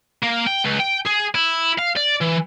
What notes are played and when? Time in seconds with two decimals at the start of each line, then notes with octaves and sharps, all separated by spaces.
0.23 A#3
0.47 G5
0.64 C#2
0.79 G5
1.05 G#4
1.35 E4
1.79 F5
1.97 D5
2.21 E3